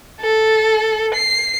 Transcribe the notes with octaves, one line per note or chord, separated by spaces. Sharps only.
A4
C7